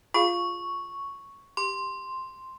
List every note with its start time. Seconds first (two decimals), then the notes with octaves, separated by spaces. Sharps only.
0.14 F4 G#4 F5 C#6
1.57 G4 C6